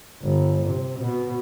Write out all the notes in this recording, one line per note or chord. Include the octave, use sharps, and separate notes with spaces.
G1
C3
B2